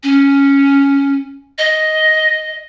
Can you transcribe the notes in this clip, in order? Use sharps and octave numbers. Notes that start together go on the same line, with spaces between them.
C#4
D#5